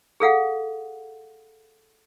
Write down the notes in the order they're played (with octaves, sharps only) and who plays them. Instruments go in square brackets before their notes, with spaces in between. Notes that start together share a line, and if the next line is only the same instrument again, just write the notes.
[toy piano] G#4 A4 F5 F#5